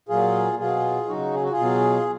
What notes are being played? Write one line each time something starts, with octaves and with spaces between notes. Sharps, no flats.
A#2 F#3 F4 G#4
B2 F#3 F4 G#4
C#3 F#3 D#4 F#4
G#4
F#4
F4 G#4
B2 F#3